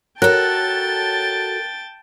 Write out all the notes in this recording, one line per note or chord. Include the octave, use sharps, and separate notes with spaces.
F#4 A4 A#4 C#5 G5 A5 F#6 A6